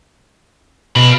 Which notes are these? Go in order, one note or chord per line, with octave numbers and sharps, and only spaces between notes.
B2 F5 B5